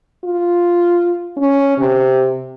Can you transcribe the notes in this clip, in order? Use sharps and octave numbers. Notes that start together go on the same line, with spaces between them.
F4
C#4
C3